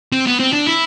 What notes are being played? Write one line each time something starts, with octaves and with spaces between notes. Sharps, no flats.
C4
B3
C4
D4
E4